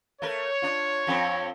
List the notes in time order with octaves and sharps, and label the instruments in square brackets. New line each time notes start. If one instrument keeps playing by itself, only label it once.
[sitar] A3 A#4 [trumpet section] C#5
[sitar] D4 F4
F2 F3 C4